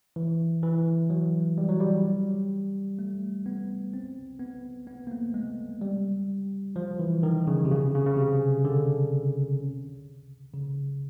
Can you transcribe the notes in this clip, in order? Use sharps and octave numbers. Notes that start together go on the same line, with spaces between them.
E3
E3
F#3
G3
F#3
G3
A3
B3
C4
B3
B3
A#3
A3
G#3
G3
F3
E3
D#3
C#3
C3
C#3
C#3
C#3
C3
D3
C#3